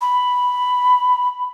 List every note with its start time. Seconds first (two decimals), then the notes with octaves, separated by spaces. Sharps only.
0.01 B5